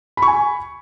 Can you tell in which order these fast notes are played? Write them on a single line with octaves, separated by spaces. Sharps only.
B5 C#6 G#5